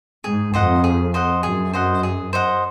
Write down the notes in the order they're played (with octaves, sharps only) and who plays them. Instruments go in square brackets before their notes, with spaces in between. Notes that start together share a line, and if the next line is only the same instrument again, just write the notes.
[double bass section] G#2 [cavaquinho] G#4
[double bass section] F2 [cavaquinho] C5 D#5 F#5
[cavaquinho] G#4
C5 D#5 F#5
[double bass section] F#2 [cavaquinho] G#4
[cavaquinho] C5 D#5 F#5
G#4
C5 D#5 F#5